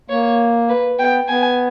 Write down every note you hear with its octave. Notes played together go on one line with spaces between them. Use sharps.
A#3 C#5
B4
B3 G5
B3 G#5